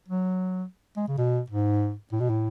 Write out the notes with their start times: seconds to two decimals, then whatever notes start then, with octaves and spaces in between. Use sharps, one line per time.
0.09 F#3
0.97 G#3
1.08 C#3
1.18 B2
1.50 G#2
2.12 A2
2.20 B2
2.30 A2